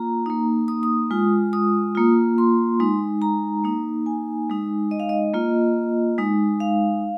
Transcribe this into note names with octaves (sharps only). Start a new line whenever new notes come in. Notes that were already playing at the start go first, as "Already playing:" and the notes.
Already playing: A#3 F4 A#5
A#3 D#4
D#6
D#6
G#3 F4
D#6
A#3 F4
C6
G#3 D#4
A#5
A#3 D#4
G#5
G#3 D#4
D#5
F5
D#5
A#3 F4
G#3 D#4
F5